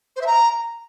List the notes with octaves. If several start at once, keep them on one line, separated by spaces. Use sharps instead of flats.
C5
E5
A#5